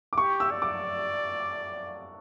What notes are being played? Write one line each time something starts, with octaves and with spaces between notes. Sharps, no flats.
D6
G4 C#6
E6
D5
D6